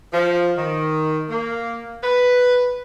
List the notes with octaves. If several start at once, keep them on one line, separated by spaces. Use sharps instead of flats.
F3
D#3
A#3
B4